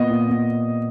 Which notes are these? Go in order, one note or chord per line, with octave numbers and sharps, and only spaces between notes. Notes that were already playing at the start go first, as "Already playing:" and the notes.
Already playing: A#2 B3 D#5
A#2
B3